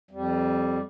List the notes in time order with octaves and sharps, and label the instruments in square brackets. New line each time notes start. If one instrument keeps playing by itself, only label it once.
[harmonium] F2 G3